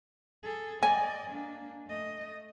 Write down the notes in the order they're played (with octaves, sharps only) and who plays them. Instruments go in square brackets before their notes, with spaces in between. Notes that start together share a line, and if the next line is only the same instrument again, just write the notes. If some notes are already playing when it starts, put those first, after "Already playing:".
[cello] G#4 A4
[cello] D5 D#5 [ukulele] G#5
[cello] A#3 D4
A3 D#5